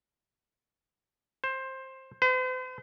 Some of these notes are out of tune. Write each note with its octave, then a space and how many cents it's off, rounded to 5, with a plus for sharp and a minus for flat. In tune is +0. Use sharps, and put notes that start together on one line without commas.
C5 +15
C5 -45